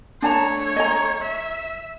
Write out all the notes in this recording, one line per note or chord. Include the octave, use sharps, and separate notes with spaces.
A3 D4 C#5 A5 A#5
D#5 A#5
E5